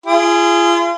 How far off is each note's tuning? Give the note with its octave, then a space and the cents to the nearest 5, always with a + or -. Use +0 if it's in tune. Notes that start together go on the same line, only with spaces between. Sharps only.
F4 -35 G#4 +0